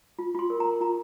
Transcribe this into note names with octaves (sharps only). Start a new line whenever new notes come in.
F4
F4 C6
A#4
A#5
A#4
F4 A#5